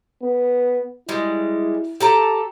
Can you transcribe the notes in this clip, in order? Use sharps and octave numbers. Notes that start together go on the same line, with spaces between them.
B3
G3 G#3 E4
G4 A4 A#5